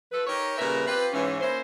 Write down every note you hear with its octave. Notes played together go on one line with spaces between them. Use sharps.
F3 A4 B4
D#4 G4 A#4 C#5
A#2 C#3 G3 A#4 B4 E5
C4 F4 G4 B4
G#2 E3 C#4
A#3 C#4 E4 C5